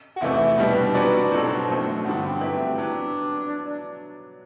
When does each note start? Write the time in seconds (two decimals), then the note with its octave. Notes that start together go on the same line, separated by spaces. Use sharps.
0.16 F#4
0.21 E2 C3 E3 A3 E4
0.58 B2 G3 B3 D4
0.94 F#3 C4 F#4 B4 D5
1.31 B2 F#3 C4 F#4 A4
1.68 F#2 F#3 A3 C4 F#4
2.04 G2 D3 G3 B3 D4
2.23 C4
2.41 F#3 A3 E4 G4 B4
2.77 F#3 B3 D4